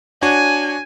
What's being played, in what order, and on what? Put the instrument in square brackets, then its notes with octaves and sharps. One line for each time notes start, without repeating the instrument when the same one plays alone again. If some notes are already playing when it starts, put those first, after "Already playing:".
[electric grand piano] D4 F#4 C#5 [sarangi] G#5